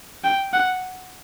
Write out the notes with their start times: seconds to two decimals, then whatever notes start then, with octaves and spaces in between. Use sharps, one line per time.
0.24 G5
0.53 F#5